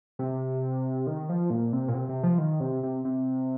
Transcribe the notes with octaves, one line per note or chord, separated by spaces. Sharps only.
C3
D#3
F3
A#2
C3
A#2
C3
C3
F3
D#3
C3
C3
C3